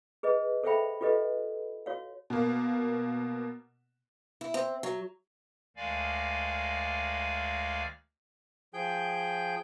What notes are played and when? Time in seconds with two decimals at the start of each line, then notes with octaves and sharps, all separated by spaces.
0.23 G#4 B4 D#5
0.63 A4 C5 E5 F5 G5 B5
1.01 F4 G4 A4 B4 D#5
1.86 F#4 C#5 F5
2.30 B2 A#3
4.41 E4
4.54 C4
4.83 F#3
5.77 D2 D#3 G#3 D5 F5 G#5
8.74 F3 G#4 G5 G6